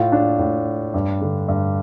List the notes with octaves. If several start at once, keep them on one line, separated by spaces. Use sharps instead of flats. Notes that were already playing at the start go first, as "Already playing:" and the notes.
Already playing: A2 F4
D4
A2
G2
D3
G2